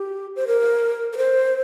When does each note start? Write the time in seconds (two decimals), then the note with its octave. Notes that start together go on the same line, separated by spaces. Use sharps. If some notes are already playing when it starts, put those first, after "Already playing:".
Already playing: G4
0.36 C5
0.47 A#4
1.13 A#4
1.17 C5